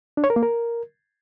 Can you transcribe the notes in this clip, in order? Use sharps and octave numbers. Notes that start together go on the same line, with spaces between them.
D4
C#5
A#4
A#3
A#4